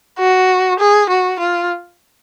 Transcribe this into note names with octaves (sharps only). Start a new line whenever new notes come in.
F#4
G#4
F#4
F4